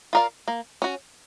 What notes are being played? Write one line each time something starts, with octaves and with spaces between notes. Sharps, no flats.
F4 A#4 D5 F5
A#3
C#4 F#4